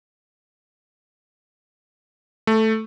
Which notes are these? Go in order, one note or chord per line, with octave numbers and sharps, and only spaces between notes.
A3